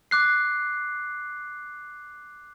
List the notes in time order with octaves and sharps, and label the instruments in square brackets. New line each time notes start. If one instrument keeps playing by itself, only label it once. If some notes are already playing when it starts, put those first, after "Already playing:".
[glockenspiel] D6 F#6 C7